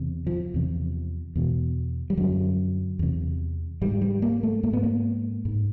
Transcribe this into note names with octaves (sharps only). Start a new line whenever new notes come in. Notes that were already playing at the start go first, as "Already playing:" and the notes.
Already playing: E2 C3
F3
E2 C3
E2 B2
G3
F#2 D3 F#3
E2 C3
G#2 G3
G3
A#3
A3
G#2 A#3
B3
A#3
G#2